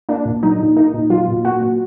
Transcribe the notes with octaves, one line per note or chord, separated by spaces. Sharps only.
A#3 D4
A#2
F#3 D#4
A#2
A#3 D#4
A#2
F#3 F4
A#2
A#3 F#4
A#2